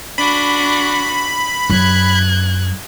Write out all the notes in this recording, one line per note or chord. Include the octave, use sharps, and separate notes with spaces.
D4 F#4 B5
F#2 F#6 G#6